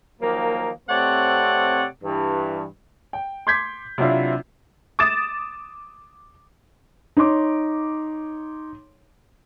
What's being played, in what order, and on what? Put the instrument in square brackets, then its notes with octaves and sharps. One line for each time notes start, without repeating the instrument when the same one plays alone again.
[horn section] D#3 F3 F#3 A#3
C3 A3 C4 C#5 D5 F#5
G2 E3
[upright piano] G5
C6 D6 G6 G#6 B6
C3 F#3 C4 D4 E4 F4
[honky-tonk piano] D6 D#6 A6 E7
[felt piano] D#4 C#5 C6 D6